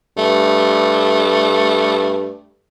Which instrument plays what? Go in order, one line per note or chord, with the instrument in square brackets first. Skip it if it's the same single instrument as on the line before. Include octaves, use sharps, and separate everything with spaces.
[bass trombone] G2 [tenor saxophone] A3